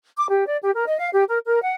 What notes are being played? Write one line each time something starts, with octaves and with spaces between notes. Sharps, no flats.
D6
G4
D5
G4
A#4
D#5
F5
G4
A#4
A#4
F#5